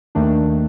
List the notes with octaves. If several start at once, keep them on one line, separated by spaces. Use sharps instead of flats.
D#2 D#3 A3 D4